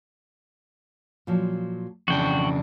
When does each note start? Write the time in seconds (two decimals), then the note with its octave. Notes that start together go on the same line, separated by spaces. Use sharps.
1.27 A#2 F3 F#3
2.08 F2 C#3 E3 D4 F#4 G5